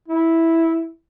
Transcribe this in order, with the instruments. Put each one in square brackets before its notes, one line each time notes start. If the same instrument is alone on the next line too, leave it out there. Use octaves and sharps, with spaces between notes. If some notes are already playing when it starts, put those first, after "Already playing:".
[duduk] E4